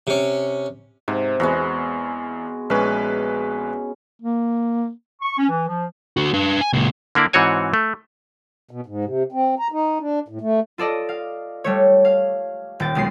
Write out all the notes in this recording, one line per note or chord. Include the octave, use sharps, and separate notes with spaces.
C3 C#4
G#2 C3
E2 G#3 B3 F#4
A#1 G#3 C#4 B4
A#3
C#6
C#4
E3
F3
D3 F#4
D4 B4
G#5
C#2 A#2
D3 A#3 E4 D5
G#2 E3 C4 F#4 C#5 G#5
A3
B2
G#2
C3
C4
A#5
D#4
D4
A2
A3
F4 A4 D5 D#5
F5
G3 A3 C#5
F5
D#1 G5 A6
B1 G#3 D#6 C7